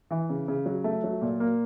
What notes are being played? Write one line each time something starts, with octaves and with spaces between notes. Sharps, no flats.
E3
C#3
C#3
F#3
A3
F#3
A#2
A#3